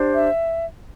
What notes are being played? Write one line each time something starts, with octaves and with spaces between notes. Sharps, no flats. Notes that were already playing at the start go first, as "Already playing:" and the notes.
Already playing: D4 G4 C5
E5